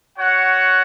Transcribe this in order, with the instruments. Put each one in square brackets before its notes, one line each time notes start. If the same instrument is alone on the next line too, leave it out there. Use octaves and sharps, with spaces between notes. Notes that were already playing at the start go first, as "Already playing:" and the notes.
[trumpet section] F#4 C#5 F#5